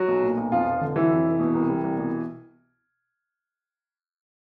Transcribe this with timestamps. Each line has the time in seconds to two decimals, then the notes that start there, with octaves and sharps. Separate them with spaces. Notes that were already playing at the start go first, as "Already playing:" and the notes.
Already playing: F#3 F#4
0.08 B1
0.23 A#2
0.37 B1
0.51 F2 F3 F4
0.66 F1
0.81 D3
0.96 E3 F#3 E4
1.10 F2
1.25 F1
1.40 B2
1.54 C2
1.69 G3
1.84 C2
1.99 B2